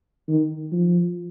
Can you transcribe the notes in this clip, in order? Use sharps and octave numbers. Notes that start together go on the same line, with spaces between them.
D#3
F3